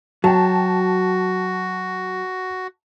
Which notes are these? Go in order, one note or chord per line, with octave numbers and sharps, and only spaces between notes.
F#3 F#4 G5 A5